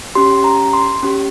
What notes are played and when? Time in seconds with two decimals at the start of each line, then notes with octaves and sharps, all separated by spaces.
0.15 C#4 G4 C6
0.44 A#5
0.73 C6
1.03 C#4 G4